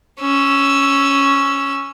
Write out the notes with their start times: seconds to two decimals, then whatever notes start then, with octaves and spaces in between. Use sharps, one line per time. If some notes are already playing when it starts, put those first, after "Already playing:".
0.20 C#4 E6